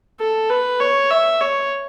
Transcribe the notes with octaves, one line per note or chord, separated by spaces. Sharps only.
A4
B4
C#5
E5
C#5